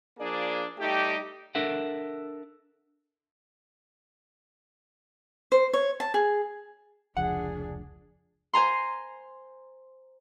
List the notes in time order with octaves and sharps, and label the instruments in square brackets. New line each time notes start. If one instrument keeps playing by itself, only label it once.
[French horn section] F3 A#3 D4 G#4 D5
G3 A3 D#4 G4
[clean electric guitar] D4 A4 A#4 E5 F#5
[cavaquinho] C5
C#5
A5
G#4
[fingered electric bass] F1 C#2 F3 [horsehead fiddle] D4 G#4 [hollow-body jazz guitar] F#5
[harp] C5 G#5 A#5 C6